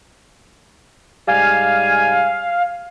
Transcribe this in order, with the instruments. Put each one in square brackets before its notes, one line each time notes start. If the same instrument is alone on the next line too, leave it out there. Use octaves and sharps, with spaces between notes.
[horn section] G#2 G3 G#5 [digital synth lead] F5